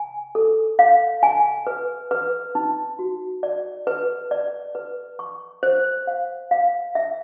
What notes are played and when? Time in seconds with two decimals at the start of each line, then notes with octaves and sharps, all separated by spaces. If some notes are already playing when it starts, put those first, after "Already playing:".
Already playing: G#5
0.35 A4
0.79 F5
1.23 G#5
1.67 B4
2.11 B4
2.55 D#4
2.99 F#4
3.43 D5
3.87 B4
4.31 D5
4.75 B4
5.19 C#6
5.63 C5
6.07 F5
6.51 F5
6.95 E5